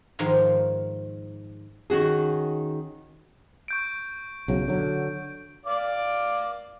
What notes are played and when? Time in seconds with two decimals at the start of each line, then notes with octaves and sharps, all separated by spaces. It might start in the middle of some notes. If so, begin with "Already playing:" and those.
0.19 G#2 D#3 F3
1.90 D#3 C#4 F#4 G#4
3.68 C#6 G6 D7
4.48 B1 C#3 F#3
4.68 D3 F#3
5.66 D5 F5 D6